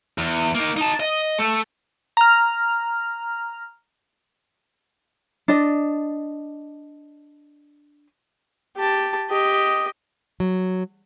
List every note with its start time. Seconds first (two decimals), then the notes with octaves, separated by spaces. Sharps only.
0.18 E2
0.55 A#3 D#4
0.77 D#4 A5
1.00 D#5
1.39 A3 A4
2.17 A#5 F6
5.48 D4 D5 D#5
8.77 G4 A5
9.30 G4 D#5
10.40 F#3